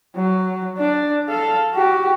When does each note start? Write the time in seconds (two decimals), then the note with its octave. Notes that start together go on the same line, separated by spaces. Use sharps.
0.15 F#3
0.77 D4 D5
1.28 A4 F5
1.74 F#4 G4